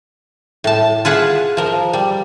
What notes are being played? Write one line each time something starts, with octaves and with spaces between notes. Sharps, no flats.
A2 A5
F4 G#4 B4 F#5
F3 A#4
G3